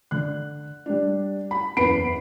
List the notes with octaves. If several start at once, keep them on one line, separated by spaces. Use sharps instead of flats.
D3 F#6
G3 D4
B5
F#1 E2 B4 B5 C7 D7